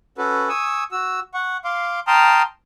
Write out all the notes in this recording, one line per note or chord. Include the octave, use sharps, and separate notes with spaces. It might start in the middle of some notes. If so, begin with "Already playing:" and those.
C#4 F#4 A4 B4
G#5 C#6 D#6 E6
F#4 E6
F#5 C#6
F5 C6 D6
G5 A5 A#5 C6 D#6 F6